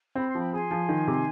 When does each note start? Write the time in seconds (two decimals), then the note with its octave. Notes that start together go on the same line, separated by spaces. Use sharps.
0.15 C4 B5
0.27 C6
0.35 F3 G5 B5
0.52 G#4 G#5 C6
0.71 F3
0.89 D#3
1.07 C3